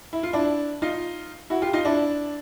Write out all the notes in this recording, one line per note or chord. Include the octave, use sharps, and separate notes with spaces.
E4
F4
D4 E4
D#4 F4
E4 F#4
F4 G4
D#4 F4
D4 E4